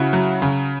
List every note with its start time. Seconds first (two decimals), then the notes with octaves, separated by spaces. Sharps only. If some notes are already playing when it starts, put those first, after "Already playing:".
Already playing: C#3 E4 F#4
0.13 F#3
0.42 C#3